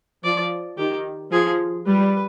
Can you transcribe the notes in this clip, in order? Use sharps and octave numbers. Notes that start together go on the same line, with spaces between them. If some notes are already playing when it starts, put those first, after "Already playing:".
F3 D5
D#3 G4
F3 G#4
G3 B4